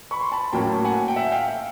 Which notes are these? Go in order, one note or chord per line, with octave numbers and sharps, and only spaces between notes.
B5 C#6
C6
A5 B5
A2 F#3 A#3 C#4 G5 A5
F#5 G#5
G5
E5 F#5
F5 G5